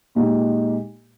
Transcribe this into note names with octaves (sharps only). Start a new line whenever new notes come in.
A#2 G#3 D#4 G4